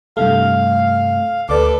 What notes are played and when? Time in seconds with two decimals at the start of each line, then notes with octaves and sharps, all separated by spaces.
0.17 G2 C3 A3 F5
1.49 D2 A4 B4 D5 D6